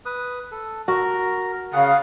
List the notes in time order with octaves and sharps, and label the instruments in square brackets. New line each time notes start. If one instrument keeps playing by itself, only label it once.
[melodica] B4 D#6
A4
[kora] F#4 [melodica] A#4
[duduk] C#3 [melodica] G#4 F#5 [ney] F5